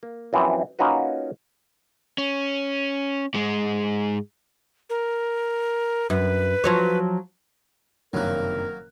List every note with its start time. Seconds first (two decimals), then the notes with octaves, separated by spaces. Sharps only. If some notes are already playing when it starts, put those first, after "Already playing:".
0.03 A#3
0.33 F#2 E3 F3 B3 C4
0.79 A#3 C#4 D#4 F4 F#4 B4
2.18 C#4
3.34 G#2 G#3
4.90 A#4
6.10 F#2 B4
6.64 F3 F#3 C#5
8.13 F#1 G2 C3 D#3 F#3 A#3 A#4 F#6